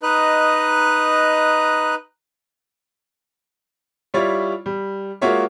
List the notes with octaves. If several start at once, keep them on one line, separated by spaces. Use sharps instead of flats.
D#4 B4 D#5 A#5 F#6
G3 E4 F4 C#5 D5
G3
G#3 A#3 F4 F#4 C#5 E5